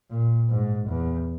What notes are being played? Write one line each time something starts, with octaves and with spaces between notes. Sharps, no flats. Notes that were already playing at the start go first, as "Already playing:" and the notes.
A#2
G#2
E2